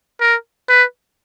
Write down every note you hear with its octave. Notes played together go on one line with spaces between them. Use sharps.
A#4
B4